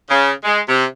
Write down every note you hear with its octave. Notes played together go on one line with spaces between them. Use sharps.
C#3
G#3
C3